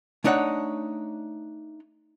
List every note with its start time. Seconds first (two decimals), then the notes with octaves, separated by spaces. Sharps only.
0.24 A3 D4 D#4 C#5 F#5